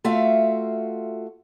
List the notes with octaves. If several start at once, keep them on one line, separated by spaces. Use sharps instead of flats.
A3 F4 F#4 E5 F5